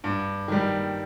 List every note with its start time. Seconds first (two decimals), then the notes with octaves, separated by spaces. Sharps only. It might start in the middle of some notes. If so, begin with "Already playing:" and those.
0.04 G2
0.48 D#3 G3